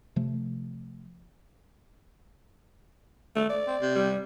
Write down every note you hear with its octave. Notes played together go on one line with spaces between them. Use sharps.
C3 F3 A3
A3
D5
C4
C3
G3